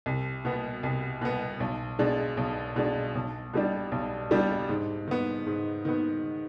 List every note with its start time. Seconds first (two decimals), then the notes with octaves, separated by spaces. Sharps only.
0.06 C2
0.45 B2 B3
0.83 C2
1.21 B2 B3
1.60 B1
1.99 B2 G#3 D4
2.37 B1
2.76 B2 G#3 D4
3.15 B1
3.54 B2 G3 D4
3.92 B1
4.31 B2 G3 D4
4.69 G#2
5.08 D#3 B3
5.47 G#2
5.85 D#3 B3